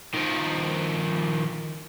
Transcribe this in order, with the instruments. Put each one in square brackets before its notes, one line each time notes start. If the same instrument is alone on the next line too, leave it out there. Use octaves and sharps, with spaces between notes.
[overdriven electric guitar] D#3 F3